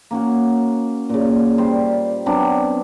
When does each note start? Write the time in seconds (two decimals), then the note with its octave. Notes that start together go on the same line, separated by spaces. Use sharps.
0.11 A#3 C#4 F#4
1.09 A#2 C#3
1.58 G3 C5
2.26 F#3 B3 C4 D4